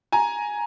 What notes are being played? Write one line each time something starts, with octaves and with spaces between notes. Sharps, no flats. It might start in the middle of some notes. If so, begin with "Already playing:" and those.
G#5 A#5